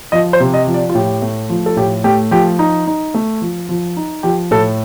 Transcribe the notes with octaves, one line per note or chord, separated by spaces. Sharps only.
F3 D#5
C5
C3
D#5
F3
D5
F4
A2 G4
A3
F3
A4
A2 G4
A3 G4
F3 G4
D#4
D#4
A3
F3
F3
D#4
F3 G4
A2 A4